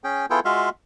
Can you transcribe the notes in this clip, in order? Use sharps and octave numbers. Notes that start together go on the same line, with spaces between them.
C#4 G#4 G5
B3 E4 F4 G#4 A4 G5
G#3 F4 F#4 E5 F5